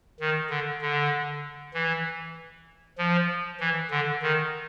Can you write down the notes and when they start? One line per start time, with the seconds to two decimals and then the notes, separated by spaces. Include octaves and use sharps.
0.20 D#3
0.50 D3
0.82 D3
1.74 E3
2.98 F3
3.60 E3
3.91 D3
4.22 D#3